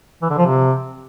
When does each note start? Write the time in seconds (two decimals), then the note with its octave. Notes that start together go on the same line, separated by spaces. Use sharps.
0.22 E3
0.30 D3
0.38 F3
0.46 C3